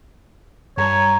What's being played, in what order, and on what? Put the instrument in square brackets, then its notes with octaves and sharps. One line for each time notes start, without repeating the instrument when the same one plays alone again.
[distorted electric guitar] G2 [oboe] C#5 [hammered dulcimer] A#5